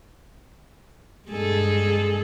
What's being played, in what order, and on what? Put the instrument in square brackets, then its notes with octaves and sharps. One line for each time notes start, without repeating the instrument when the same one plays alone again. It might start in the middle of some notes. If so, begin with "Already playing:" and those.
[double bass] G2 [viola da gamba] G#3 G#4 A4